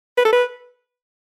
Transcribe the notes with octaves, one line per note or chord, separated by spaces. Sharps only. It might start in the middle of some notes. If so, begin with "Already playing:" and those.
B4
A4
B4